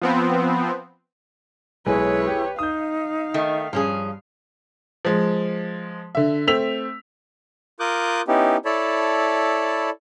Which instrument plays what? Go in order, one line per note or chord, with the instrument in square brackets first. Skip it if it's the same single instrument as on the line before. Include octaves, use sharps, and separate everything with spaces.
[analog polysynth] F3 B3 C4
[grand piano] B1 G#3 G#5 [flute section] E4 G#4 [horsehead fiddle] B4 C#5
[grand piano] G4
[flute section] D#4 [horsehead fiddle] F5 [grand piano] D#6 G6
[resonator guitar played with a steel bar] D#3 A3
[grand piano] G2 [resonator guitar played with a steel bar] F3 C#4 G#4
[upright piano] F3 G#3
D3 E5
A3 C4 E6 B6 F7
[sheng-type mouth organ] F4 A#4 D6 D#6 F#6 G6
B3 C#4 D#4 E4 G4
E4 A4 C#5 D5 A5 B5